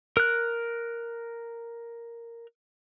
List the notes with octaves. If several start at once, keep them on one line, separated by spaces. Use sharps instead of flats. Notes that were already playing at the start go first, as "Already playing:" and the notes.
A#4 F#6